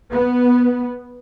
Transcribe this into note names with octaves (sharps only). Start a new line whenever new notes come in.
B3